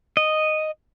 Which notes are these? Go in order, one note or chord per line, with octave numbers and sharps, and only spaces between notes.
D#5